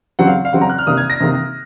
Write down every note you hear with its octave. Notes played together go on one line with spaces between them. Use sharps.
C#3 F#3 C4 F#5
F5
F5
C#3 F#3 C4 F#5
A#5
F#6
F6
C3 D#3 A#3 D#6
G#6
A#6
C3 D#3 A#3